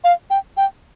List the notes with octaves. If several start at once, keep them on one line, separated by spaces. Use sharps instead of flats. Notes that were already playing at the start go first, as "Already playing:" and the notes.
F5
G5
G5